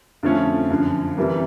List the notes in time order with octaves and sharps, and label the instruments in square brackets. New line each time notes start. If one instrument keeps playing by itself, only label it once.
[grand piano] F2 D3 F3 A3 C#4
F#2 D3 F3
C3 E3 G3 A#3